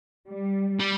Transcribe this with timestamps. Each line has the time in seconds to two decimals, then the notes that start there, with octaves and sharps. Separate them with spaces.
0.28 G3
0.79 G3